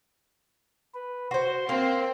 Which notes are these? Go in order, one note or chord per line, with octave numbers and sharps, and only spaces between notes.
B4
F#4 C5 C6
A#3 C4